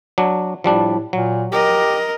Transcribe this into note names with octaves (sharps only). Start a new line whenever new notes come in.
F#3 D4
A2 F3 G3 D4
A#2 F#3
G4 A#4 D#5